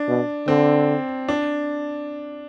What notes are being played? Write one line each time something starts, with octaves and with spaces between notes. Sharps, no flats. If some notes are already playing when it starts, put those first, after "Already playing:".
Already playing: D4
B2
D3 C4
D4